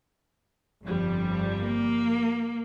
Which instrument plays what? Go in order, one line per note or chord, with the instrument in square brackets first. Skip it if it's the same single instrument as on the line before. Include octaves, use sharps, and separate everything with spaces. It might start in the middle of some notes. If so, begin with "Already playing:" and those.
[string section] G1 F2 G3
[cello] A#3